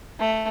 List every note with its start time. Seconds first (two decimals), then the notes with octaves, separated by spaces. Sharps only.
0.19 A3